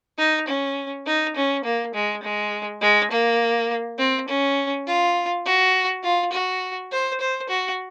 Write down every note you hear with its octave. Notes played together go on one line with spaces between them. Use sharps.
D#4
C#4
D#4
C#4
A#3
G#3
G#3
G#3
A#3
C4
C#4
F4
F#4
F4
F#4
C5
C5
F#4